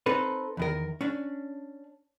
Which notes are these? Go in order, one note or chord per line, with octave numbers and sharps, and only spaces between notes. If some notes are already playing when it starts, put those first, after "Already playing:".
C4 D#4 A4 B4
E2 D#3 A#4
C#4 D4